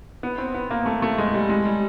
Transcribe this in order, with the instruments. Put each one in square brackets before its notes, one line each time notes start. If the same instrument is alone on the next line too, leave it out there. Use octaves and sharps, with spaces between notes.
[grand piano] B3
C4
B3
A#3
A3
A3
G#3
G3
G#3
G3